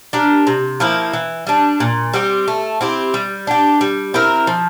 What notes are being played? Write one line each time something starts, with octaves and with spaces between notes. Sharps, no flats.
D4 G4 A#4
C3
F3 A#3 E4
E3
G3 D4
A#2
G3 C4 G4
A3
C4 E4 G4
G3
D4 G4
G3
C4 E4 A#4
F3